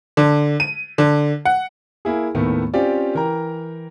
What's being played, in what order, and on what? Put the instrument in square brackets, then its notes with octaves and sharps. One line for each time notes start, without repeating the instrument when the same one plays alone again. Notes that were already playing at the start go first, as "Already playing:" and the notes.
[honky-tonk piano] D3
D#7
D3
F#5
[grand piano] A#3 E4 G#4
D#2 A2 D#3 A3 B3
C4 C#4 F4 G4 D5
E3 A#4 G5 A#5